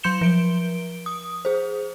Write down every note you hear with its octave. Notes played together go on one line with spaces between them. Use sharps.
F#3 C6 G6 C#7 E7 G7
F3 D7 G7
D#6
G#4 C5